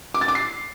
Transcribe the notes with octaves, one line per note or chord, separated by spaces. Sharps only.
D6
A6
D6
C7